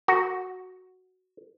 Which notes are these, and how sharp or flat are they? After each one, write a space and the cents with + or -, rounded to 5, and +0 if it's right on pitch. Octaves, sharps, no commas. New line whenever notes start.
F#4 +0 A#4 -35